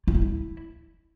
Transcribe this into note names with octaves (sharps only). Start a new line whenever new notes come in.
F4
D#4
E4